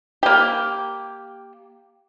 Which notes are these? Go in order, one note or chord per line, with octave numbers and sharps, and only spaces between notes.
A#3 G4